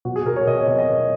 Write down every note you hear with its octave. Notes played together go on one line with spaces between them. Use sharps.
B2 F#4
G#4
B2 A#4
C#5
B2 D#5
C#5
B2 D#5
D#5
B2